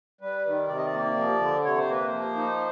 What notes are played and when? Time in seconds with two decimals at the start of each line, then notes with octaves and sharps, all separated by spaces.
0.21 G3 B4
0.45 D#3
0.68 C3 D5
0.77 D#5
0.86 D5
0.93 A#3
1.17 F3
1.40 D3
1.64 C3 C#5
1.78 C5
1.88 A#3 B4
2.06 C5
2.12 F3
2.36 D#4